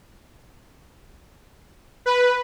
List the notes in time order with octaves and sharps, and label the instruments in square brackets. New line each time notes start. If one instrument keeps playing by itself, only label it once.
[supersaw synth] B4